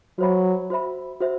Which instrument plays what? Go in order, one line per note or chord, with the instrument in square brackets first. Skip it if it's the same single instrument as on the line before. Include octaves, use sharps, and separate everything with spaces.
[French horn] F#3 [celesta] F#4 C5 E5 B5
[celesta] F#4 C5 E5 B5
F#4 C5 E5